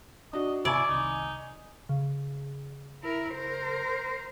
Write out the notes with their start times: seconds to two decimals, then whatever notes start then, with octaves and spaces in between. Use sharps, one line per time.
0.33 D4 F#4 D#5
0.65 G#2 C3 B3 E4 D5 G#5 C#6 G#6
0.89 C2 C3 D#3 D#4
1.89 C#3
3.03 E4 A#4
3.33 A#4 C5